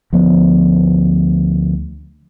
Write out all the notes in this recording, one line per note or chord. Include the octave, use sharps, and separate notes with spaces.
D2 F3 B3